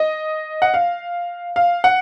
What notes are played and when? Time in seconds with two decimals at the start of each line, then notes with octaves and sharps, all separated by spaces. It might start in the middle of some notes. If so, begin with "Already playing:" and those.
Already playing: D#5
0.62 F#5
0.74 F5
1.56 F5
1.84 F#5